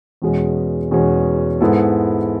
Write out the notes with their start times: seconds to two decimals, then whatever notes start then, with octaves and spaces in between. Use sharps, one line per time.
0.22 E2 B2 G#3 C#4
0.91 E2 B2 G#3 C#4
1.61 G#2 G#3 B3 E4 A4